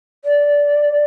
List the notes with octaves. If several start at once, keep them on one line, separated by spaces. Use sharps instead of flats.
D5